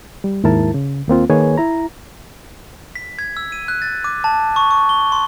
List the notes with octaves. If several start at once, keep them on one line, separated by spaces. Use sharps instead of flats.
G3
D#2 G#2 E4 A#4 A5
C#3
D#2 A#3 C4 F4
D#3 A#3 G#4 B4 C#5 G#5
E4 A#5
B6
G#6
E6
D#7
F#6
A6
D6
A5
C#6
C#6
G7
C6